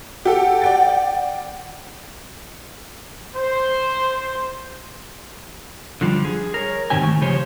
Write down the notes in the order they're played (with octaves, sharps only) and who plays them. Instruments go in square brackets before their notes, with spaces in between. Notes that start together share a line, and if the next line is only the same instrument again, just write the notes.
[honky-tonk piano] G4 A4 [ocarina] F#5
[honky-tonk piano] D5 G5 A6
[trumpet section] C5
[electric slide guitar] D3 F3 G3
G#4
A#4 C#5
E2 G#2 D#3 C4 G4 G#5
D#3 A3
C#3 F3 G4 C5 C#5